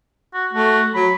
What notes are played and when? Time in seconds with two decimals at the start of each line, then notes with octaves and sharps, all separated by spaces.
0.34 F#4
0.53 A3 F#4
0.94 F#3 B5